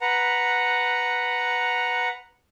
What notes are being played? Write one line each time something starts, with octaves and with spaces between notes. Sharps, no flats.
B4 F#5 A#5